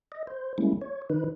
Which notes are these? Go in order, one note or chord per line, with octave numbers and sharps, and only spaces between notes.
D#5
C5
G3 G#3 A#3 C#4 E4
C#5
D#3 D#4 B4